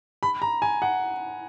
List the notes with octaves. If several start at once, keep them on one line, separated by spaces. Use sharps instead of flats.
B5
A#5
G#5
F#5